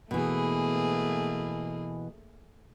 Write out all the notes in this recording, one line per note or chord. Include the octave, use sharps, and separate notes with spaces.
B2 E3 A3 A#3 G#4